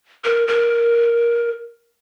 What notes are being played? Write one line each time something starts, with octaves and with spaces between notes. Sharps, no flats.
A#4
A#4